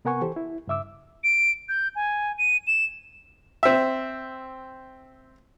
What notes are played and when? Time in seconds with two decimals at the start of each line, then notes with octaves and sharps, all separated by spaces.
0.05 C3 B3 A#4 F#5 G#5 C#6
0.21 E3 G4 A4 C5
0.36 E4
0.68 G2 C#3 E5 D6 E6
1.24 D7
1.69 G6
1.96 G#5
2.38 D#7
2.67 E7
3.63 C4 E5